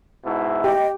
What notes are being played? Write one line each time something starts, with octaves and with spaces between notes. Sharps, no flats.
G#2 B2 E4
G4 D#5 G5